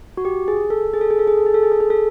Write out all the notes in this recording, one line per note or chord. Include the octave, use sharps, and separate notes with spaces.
F#4
G4
G#4
A4
G#4
A4
G#4
A4
G#4
A4
G#4
A4
G#4
A4
G#4
A4